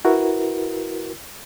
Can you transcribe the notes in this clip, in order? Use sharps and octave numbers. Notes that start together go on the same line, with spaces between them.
E4 F#4 A#4 B4